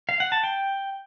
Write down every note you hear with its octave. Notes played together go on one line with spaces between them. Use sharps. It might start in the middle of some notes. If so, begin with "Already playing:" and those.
F5
F#5
A5
G5